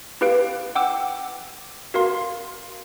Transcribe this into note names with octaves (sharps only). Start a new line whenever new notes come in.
E4 G4 B4 F5 D7
F#5 G5 D6 E6
F#4 A#4 F5 C6